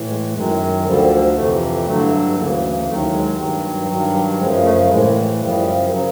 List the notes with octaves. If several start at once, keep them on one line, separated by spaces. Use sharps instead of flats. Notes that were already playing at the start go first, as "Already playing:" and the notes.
Already playing: A2 E3
G#3
F#2 D#3 F#3 G#3
D2 D3 F3 G3
F2 C3 E3 A3
G2 D3 F#3 A3
D2 C#3 E3 A#3
D#2 D#3 F#3 A3
G#3
G2 D#3 F#3
G2 D#3 F#3
G3
F#2 C#3 F3 G#3
A3
A2 E3 G#3
F#2 C#3 F3 G3
C#3 F#3